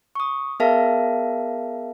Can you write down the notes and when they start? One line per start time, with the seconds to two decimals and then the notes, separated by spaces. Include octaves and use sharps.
0.15 C#6 D#6
0.60 B3 G#4 A#4 E5 F5 A5